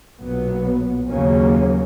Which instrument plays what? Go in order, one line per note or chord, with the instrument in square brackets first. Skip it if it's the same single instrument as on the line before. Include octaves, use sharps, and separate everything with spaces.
[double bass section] B1 A#2 F#3 B3
D#2 C#3 F#3 A#3 C#4